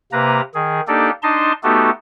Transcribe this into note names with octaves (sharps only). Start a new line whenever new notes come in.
C3 A#3 B4 A#5
D#3 G#4
A#3 D4 D#4 G4 A4 D5
D4 D#4 D#5 A5 C6
A3 B3 D#4 F#4 G4 A4